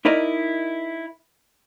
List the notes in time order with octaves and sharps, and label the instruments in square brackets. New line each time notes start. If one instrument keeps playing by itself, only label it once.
[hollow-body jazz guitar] D#4 E4 A#4 D5 D#5